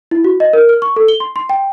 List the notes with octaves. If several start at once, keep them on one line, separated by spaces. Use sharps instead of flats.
E4
F#4
D#5
A#4
F6
C#6
A4
G7
C6
C6
G5